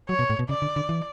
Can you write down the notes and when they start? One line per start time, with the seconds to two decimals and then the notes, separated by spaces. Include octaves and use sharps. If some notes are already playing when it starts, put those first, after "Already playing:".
0.09 F#3 C#5
0.19 B2
0.30 A2
0.39 B2
0.49 C#3 D5
0.62 D3
0.76 D3
0.89 E3